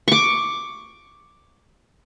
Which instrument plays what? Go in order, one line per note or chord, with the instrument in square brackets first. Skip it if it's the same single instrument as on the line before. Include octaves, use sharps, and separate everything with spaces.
[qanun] C#6 D6